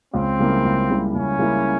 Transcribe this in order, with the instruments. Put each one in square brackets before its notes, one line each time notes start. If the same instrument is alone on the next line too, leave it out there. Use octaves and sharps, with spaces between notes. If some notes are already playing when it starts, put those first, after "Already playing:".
[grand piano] C#2 [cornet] C4
[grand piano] C#3 G3 A#3 E4
C#2
C#3 G3 A#3 E4
[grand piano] C#2 [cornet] C#4
[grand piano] C#3 G3 A#3 E4